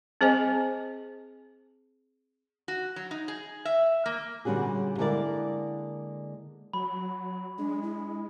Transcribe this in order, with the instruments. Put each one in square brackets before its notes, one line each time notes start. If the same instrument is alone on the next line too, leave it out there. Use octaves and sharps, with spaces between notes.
[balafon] C4 G#4 C5 D#5 G#5
[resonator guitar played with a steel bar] F#4
F#3
D#4
G#4
E5
A#3
[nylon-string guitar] A#2 D3 G3 C#4 F#4 G#4
D3 G#3 A#3 E4 A#4 D5
[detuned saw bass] F#3 [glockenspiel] B5
[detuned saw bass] G#3 [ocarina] D4
[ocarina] E4